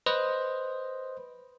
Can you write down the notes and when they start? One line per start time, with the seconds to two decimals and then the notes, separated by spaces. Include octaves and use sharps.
0.06 B4 C5 D#5